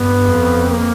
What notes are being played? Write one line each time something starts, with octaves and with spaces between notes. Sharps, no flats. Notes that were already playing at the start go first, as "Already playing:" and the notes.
Already playing: G2 B3
F2
A#3